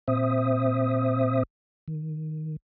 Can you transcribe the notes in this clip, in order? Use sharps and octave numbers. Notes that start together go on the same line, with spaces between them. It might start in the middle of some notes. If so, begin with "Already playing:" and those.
A#2 C4 C5 E5 D#6
D#3